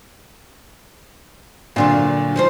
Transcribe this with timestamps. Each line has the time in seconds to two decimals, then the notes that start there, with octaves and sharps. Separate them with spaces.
1.76 A#2 D3 F#3 D4 F4
2.36 F3 D#4 C5